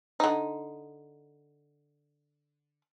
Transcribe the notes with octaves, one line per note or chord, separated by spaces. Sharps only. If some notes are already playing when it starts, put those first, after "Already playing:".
D3 D#4